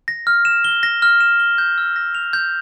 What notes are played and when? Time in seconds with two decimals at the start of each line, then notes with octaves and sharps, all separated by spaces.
0.08 A#6
0.27 F6
0.45 E7
0.64 G7
0.83 A#6
1.02 F6
1.20 E7
1.40 G7
1.58 G6
1.78 E6
1.96 A#6
2.15 F7
2.33 G6